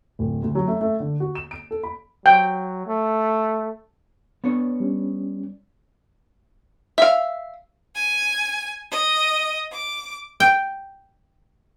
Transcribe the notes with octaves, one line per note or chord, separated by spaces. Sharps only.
D1
D2
F#3
A3
A3
D3
F#4
E7
D7
A4
B5
F#3 G5
A3
B3 D4 C#5
G3 C#4
E5 F5
G#5
D#5
D6
G5